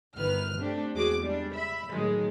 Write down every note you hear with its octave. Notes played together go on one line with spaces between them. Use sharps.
G1 D#3 B4 F6
A3 C4 D4 G4
E2 G#3 F#4 G#4 D6
G3 G#3 D4
E5 B5
A2 D#3 F#3 G#3